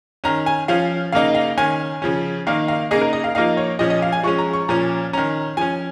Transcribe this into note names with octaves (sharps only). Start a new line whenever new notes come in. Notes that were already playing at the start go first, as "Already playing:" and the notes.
D#3 C#4 A#5
G#5
F3 C#4 F5
C#3 A#3 D#4 F5
F5
D#3 C#4 G#5
C#3 F3 C#4
D#3 A#3 D#4 F5
F5
C#3 A#3 D#4 G#4
A#4
D#5
F5
F3 A#3 D#4 F5
C#5
A#2 F3 C#4 D#5
D#5
F5
G#5
F3 G#3 C#4 C#6
A#5
C#6
A#2 F3 C#4 A#5
D#3 C#4 A#5
F3 C#4 G#5